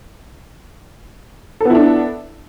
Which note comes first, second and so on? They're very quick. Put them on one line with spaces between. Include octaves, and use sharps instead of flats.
A4 B3 E4 D4